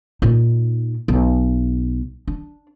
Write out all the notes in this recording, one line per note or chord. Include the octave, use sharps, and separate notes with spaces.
A#2 D#4
B1
D4